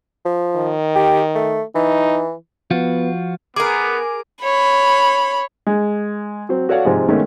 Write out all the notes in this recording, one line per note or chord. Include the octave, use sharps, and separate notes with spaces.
F3
D#3
G4
A3
E3 D#4
F3 B3 F4 F#4
B3 G#4 A#4 D6
C#5 B5
G#3
F#3 C4
F#4 A4 C#5 D5 F5 F#5
G#2 C3 F3 G#3
D#3 G#3 A3 B3 C#4 D#4